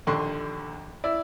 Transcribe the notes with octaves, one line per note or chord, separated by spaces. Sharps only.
A#1 D#2 D3 C6 C#6
E4 D5 E5